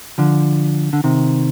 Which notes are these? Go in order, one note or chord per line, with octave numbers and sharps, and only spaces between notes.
D3 F3
D3
C3 D#3